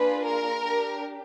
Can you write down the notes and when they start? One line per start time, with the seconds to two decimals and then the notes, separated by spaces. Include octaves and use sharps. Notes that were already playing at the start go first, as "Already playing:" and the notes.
Already playing: A#3 D4 F4 G#4 B4
0.25 A#4
0.63 D4 G4